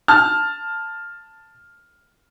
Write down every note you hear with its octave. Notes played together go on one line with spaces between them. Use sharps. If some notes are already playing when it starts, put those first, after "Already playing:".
A5 F6